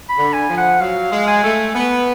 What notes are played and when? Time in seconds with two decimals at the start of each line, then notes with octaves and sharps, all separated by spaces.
0.09 B5
0.18 D3
0.33 G#5
0.49 F3
0.57 F#5
0.81 F#3 F5
1.12 G#3
1.27 G#5
1.44 A3
1.75 B3